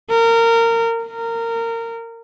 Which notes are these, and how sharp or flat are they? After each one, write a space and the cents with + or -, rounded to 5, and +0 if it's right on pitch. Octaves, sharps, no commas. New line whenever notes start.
A#4 -20
A#4 -20